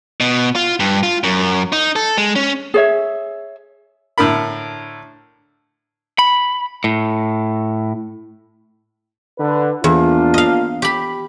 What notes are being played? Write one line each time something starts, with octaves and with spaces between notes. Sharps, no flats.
B2
F4
G2
F4
F#2
D#4
A4
G#3
C#4
G#4 C#5 E5
A2 D3 A#4 B5
B5
A2
D3 B4
E2 A#3 D4 F4
D#5 F5
G4 B5